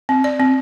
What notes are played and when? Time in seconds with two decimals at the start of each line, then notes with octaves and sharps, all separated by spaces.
0.09 C4
0.24 D5
0.40 C4